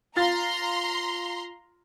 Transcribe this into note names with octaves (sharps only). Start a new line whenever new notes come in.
F4 F5 A#5 C6 A6